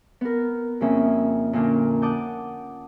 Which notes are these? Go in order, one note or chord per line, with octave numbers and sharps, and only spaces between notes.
B3 A#4
F2 C#3 A#3 C#4 E5
A#2 D3 A#3 C#4 D4
F#5 A5 D6 D#6 G6